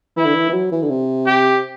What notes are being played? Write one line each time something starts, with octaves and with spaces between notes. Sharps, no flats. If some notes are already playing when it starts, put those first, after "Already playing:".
E3 E4
D3
E3
E3
F#3
E3
D3
C3
G4